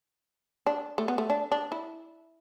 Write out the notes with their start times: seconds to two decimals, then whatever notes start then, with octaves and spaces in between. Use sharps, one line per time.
0.66 D4
0.98 A3
1.08 B3
1.18 A3
1.30 D4
1.51 D4
1.72 E4